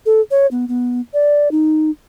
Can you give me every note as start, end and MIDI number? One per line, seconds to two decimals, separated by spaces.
0.06 0.21 69
0.31 0.46 73
0.51 0.65 59
0.68 1.01 59
1.14 1.51 74
1.51 1.90 63